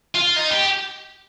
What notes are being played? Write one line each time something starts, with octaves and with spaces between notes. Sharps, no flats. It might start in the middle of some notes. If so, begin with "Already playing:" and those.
F4
D#4
G4